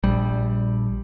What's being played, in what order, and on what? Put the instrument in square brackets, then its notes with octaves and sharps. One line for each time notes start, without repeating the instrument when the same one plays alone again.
[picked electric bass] A#1 G3